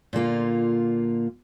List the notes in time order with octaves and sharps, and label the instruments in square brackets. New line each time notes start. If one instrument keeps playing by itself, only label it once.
[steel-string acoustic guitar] A#2 D3 A#3 F4